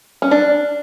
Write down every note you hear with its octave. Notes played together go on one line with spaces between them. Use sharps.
C#4
D4